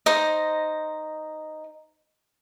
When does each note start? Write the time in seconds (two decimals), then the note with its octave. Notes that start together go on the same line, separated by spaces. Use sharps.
0.06 D#4 C5 D#5